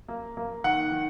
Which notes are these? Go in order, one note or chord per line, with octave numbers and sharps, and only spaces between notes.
A#3
A#3
D#3 F#5
D#3